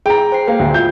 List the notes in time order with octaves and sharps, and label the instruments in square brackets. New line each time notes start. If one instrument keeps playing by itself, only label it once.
[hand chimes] G#4 [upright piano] G5 A#5
[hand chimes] C5 C7
[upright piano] A#3 [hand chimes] G5
[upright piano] D2
[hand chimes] F4 [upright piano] G6